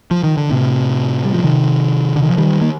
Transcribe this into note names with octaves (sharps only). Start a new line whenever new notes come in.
F3
D#3
D3
A2 C3
G3
F3
C3 D#3
D3
D#3
F3
D#3 G3
A#3